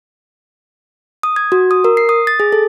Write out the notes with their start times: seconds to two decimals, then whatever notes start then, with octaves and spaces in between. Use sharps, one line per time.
1.23 D#6
1.36 G#6
1.52 F#4
1.71 D#6
1.85 A#4
1.97 C7
2.09 D#6
2.27 A6
2.40 G#4
2.53 A4